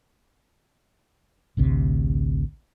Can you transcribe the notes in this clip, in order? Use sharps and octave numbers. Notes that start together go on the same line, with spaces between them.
A1 D2 C3